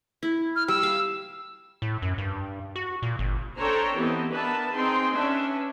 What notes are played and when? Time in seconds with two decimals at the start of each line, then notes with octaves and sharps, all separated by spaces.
0.23 E4
0.56 F6
0.68 G3 E6
0.83 F5
1.82 A2
2.02 F#2
2.18 G2
2.76 F#4
3.02 A#2
3.19 G1
3.60 D4 A4 C5 C#5 G5 A#5
3.97 E3 B3 C4 G4 A4 D#5
4.32 B3 D4 A#4 B4 E5 A5
4.75 C4 D#4 G#4 G5 C6
5.12 C#4 D4 B4 E5